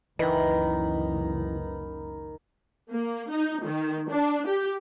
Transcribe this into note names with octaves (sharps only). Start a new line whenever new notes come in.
F#1 C#2 D#3 E3 B4 D#5 B5
A#3
D#4
D#3
D4
G4